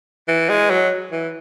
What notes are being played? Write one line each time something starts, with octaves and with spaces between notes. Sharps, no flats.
E3
G#3
F#3
E3